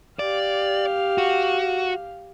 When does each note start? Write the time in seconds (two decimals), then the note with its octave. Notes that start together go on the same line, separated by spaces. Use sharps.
0.19 G4 D5 F5
1.18 F#4